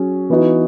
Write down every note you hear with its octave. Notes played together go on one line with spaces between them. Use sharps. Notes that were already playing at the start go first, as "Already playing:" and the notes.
Already playing: F#3 C#4 G#4
E3 B3 D#4 F#4